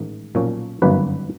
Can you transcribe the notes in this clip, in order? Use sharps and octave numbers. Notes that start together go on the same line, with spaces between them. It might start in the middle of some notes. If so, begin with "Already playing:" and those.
Already playing: A1 G#2 D#3
B1 A#2 F3 A#3 C#4
G1 F#2 D#3 F#3 A#3 B4